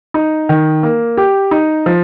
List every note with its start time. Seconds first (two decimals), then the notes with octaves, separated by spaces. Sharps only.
0.14 D#4
0.49 D#3
0.83 A#3
1.17 G4
1.51 D#4
1.86 F3